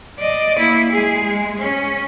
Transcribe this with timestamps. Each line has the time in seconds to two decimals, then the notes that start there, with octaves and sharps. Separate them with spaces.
0.20 D5 D#5
0.59 A#3 E4
0.92 G#3 G#4
1.26 G#3
1.59 C#4